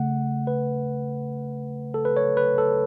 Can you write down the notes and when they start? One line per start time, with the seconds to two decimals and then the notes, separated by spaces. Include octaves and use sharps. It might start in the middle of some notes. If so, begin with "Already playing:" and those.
Already playing: C#3 A3 F#5
0.47 B4
1.94 A4
2.05 B4
2.17 C#5
2.37 B4
2.58 A4